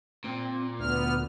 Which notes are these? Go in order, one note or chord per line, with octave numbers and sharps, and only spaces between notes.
A#2 C4
D2 B3 F6